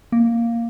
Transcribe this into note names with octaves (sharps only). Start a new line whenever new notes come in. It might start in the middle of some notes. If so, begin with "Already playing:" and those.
A#3